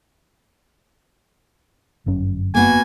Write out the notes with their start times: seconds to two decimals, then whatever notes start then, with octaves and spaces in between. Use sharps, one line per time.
2.06 G1 F#2 C#4
2.54 A#3 B3 F#4 G#5